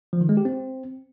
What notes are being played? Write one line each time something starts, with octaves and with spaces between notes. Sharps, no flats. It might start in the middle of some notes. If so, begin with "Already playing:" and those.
F3
D#3
G#3
G4
C4